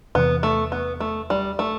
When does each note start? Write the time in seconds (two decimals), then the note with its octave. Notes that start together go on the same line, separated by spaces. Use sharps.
0.15 E2 C3 E3 B3
0.43 A3
0.72 B3
1.00 A3
1.30 G3
1.59 A3